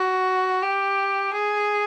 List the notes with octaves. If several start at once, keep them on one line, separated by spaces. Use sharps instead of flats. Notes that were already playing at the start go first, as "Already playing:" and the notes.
Already playing: F#4
G4
G#4